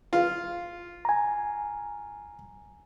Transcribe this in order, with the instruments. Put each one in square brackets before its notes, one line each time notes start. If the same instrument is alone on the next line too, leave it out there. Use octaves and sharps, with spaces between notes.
[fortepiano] F4
[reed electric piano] G#5 A#5